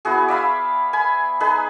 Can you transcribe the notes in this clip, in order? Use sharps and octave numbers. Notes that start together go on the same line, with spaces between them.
B3 E4 F#4 G#4
D5 E5 F5 B5
G#5 B5
D#4 G#4 B4